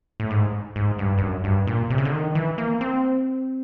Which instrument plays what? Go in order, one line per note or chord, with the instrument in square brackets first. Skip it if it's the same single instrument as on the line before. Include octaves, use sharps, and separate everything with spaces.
[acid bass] A2
G#2
G#2
G2
G2
F#2
G2
A#2
C3
C#3
D3
D#3
E3
A#3
C4